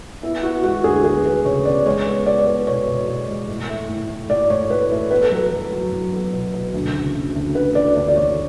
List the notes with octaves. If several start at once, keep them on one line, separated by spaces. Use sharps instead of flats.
B3 E4
B3 F#4
G#3 F#4
D2 G#4
B3 G#4
B3 B4
C#3 C#5
B3 D5
G#3 C#5
B3
B3 D5
B3
B2 C#5
B2
B2
G#3
A2
A3
A2
A2
A2 D5
A2 C#5
A2 B4
A3 A4
B3 B4
A4
F#3 B4
F#3
F#3
F#3
B3
B2
B2
D2
C#3
D2
D2
D2 B4
D2 D5
D2 D5
D5
D2 C#5